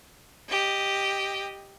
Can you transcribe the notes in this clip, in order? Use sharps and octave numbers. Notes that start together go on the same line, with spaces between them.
G4 D#5